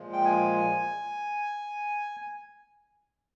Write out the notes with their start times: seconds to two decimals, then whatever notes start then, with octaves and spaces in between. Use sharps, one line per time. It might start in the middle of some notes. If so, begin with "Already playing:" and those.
Already playing: A#2 F3 G#3
0.13 G5
0.25 G#5